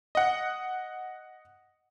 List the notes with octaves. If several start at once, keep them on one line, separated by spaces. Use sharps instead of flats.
D#5 F#5